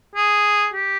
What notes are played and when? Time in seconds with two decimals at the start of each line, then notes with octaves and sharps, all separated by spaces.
0.16 G#4
0.74 G4